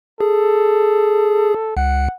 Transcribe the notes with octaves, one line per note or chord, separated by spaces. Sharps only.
G#4 A4
C#2 F#5